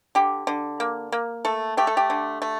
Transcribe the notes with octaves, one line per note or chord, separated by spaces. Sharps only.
D3 G4
D3
A#3
A#3
A3 A4
A3 G4
A4
G4
D3
A3